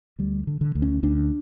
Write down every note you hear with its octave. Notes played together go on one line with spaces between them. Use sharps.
D2 G3
D3
D3
D2
C#4
D2 D4